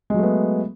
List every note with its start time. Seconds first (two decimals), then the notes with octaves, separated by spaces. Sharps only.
0.10 G#3
0.14 F#3
0.19 A3
0.23 B3